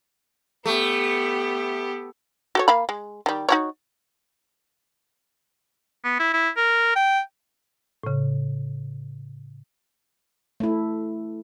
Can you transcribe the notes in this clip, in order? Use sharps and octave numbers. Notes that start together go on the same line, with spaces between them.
A3 B3 G4
F#4 A4 C#5
A#3 F5 B5
G#3
D#3 G3
D#4 F#4 C#5
B3
E4
E4
A#4
G5
A2 C#3
A3 E4